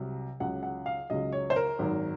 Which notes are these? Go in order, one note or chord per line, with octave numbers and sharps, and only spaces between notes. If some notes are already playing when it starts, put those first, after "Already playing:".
Already playing: C2 C3 F#3
C#2 C#3 F#3 F#5
F#5
F5
C#2 C#3 F#3 D#5
C#5
C5
A#4
G#1 F#2 D#3